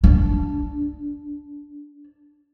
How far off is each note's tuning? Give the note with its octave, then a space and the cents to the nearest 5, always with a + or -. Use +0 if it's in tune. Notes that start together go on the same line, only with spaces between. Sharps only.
D4 -15